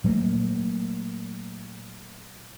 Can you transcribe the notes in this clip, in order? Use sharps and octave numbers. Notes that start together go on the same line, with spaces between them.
A#2 F#3 A3 A#3